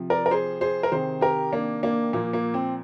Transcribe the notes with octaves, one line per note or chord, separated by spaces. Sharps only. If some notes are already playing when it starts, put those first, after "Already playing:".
Already playing: C3 F3
A#4 D5
A#4
G#4 C5
G#4 C5
A#4
C3 D#3 G#4 C5
G4 A#4
A#3 D4
A#3 D4
A#2 F3 A#3
A#3
C4